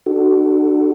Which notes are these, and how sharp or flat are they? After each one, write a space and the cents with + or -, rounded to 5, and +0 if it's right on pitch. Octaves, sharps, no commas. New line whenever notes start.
D4 +40 F#4 +20 A4 +0